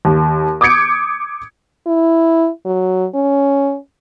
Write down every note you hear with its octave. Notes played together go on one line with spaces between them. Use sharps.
D#2
D6 D#6 G6 G#6 C#7 D7
E4
F#3
C#4